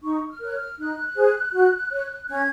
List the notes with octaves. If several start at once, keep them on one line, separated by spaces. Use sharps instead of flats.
D#4 C#6
F6
A#4 C#5 F#6
F6
D#4 F#6
G#4 C5
F#4
C#5
C#4 G#6